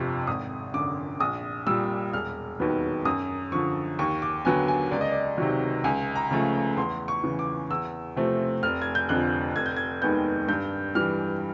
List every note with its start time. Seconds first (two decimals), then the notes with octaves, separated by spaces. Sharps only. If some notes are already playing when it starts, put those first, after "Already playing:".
Already playing: G1 F2 C3 F3
0.27 G#1 D#6
0.74 F#2 D3 D6
1.20 A#1 D#6
1.67 A#2 G3 E6
2.13 E1 F6
2.60 D#2 D#3 F#3 B3
3.05 F#2 D#6
3.52 D3 F3 C#6
3.99 D#2 C#6
4.22 D6
4.45 D3 F#3 B3 G#5
4.68 G#5
4.91 C#2 D5
5.01 D#5
5.11 D5
5.38 C3 D#3 F#3
5.84 C#2 G#5
6.16 A#5
6.31 C#3 F3 A3
6.77 E2 C6
7.08 C#6
7.23 C#3 E3
7.39 D6
7.70 E2 E6
8.16 C3 F3 A3 C4
8.63 F1 F6
8.82 G#6
8.95 G6
9.09 F2 D3 F3 F#6
9.56 F1 G#6
9.66 G6
9.77 G#6
10.02 D#2 D#3 G#3 B3 G6
10.48 G2 G6
10.95 E3 G3 F6